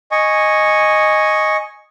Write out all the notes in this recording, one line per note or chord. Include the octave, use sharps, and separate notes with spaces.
D#5 G#5 C#6